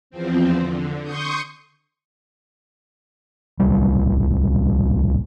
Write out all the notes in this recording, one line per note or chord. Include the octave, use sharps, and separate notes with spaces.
E2 F3 C4
D3
C6 C#6 D#6 G6
D1 C2 G3